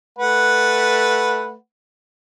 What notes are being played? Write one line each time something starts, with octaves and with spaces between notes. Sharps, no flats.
A3 B4 F#5